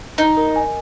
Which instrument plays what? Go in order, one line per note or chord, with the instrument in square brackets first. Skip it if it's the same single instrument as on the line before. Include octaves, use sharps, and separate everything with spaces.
[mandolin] D#4 [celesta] D#5
[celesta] A#4
G#5